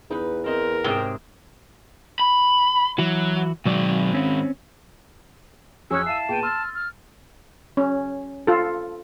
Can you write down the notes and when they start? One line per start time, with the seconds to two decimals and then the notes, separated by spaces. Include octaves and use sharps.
0.10 E2 D#4 B4
0.46 C4 A#4 D#5
0.84 G#2 C3 C4 G#4 C#5 G5
2.19 B5
2.99 E3 F#3 E4 F#4
3.66 B1 G#2 D#3 F#3 D5
4.13 C4 C#4
5.91 F2 F#3 C#4 G#4 G#5 D#6 E6 F#6
6.06 E4 F5 A5 C7 D#7
6.29 A#2 B3 G#4 G5 D#7
6.43 C6 E6 F6 A6
6.75 F6
7.77 C#4
8.47 F4 A4